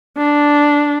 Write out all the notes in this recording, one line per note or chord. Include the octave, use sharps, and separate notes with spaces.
D4